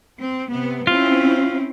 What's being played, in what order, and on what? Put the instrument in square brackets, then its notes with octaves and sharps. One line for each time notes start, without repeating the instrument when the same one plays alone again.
[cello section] C4
C3 B3
[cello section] C4 C#4 E4 [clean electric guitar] F4